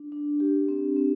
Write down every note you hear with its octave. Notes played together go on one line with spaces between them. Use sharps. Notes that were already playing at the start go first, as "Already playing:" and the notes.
Already playing: D4
D4
G4
C4
C4